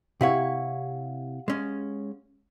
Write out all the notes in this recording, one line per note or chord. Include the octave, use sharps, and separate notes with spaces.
C3 E4 G4 C#5 F5 F#5
G#3 C#4